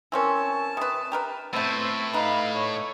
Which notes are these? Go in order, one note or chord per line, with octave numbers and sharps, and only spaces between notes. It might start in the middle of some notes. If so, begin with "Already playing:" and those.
E3 C4 C#4 A#4 A5 C#6 E6
C3 B4 D#6
G4 A#4 B4
A2 A3 B3 C4 B4 C5 E6 A6
D#4 B4 F5 B5
C#5